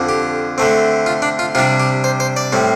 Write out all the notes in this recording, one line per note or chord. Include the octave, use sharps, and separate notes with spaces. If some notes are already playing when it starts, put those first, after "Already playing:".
Already playing: F2 D3 F3 D4
G4
D3 A3 C4
F4
D4
F4
C3 G3 D4 F4
G4
C5
C5
D5
A2 G3 C4